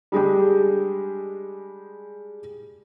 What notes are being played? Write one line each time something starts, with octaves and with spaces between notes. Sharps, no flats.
G3 G#3 D4 G4